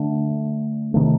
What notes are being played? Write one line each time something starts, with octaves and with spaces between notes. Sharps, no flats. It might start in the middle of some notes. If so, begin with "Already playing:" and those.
Already playing: D3 A3 D4
C3 D#3 A3